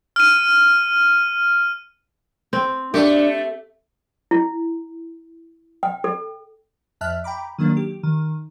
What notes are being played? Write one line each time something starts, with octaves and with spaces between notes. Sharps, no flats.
F6 D#7
C4
A3 D4 G4
E4
G5
A4
F2 E5 A5 F6 F#6
G5 A#5 B5 D6
D#3 F#3 A#3 D4
G4
D#3